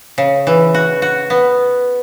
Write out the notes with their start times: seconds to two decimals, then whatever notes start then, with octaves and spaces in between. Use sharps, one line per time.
0.18 C#3
0.47 E3
0.74 F#4
1.02 F#4
1.30 B3